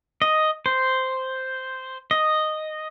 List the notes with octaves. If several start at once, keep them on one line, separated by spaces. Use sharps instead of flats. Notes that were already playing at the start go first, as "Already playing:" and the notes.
D#5
C5
D#5